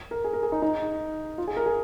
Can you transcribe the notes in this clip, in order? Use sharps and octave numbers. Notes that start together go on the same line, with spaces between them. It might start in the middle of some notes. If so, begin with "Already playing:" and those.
A#4
G#4
A#4
G#4
D#4
D#4
F4
G#4
A#4
G#4